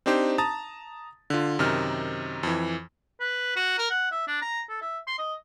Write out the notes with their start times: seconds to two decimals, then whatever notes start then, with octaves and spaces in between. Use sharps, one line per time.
0.06 C4 D4 D#4 G4 C5
0.38 A5 A#5 D#6 A6
1.30 D3 F4
1.59 F#2 C3 D#3 D#4 F6
2.43 F2 E3
3.20 B4
3.56 F#4
3.78 A#4
3.90 F#5
4.11 E5
4.28 D4
4.42 A#5
4.69 A4
4.81 E5
5.07 C6
5.19 D#5